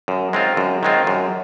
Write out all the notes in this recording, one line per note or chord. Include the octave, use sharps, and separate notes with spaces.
F#2
D#3 G#3 C4 F4
F#2
D#3 G#3 C4 F4
F#2